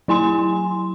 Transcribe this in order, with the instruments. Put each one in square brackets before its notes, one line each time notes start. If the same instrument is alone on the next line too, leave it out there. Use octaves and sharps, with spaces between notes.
[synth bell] F#3 E4 G#5 C6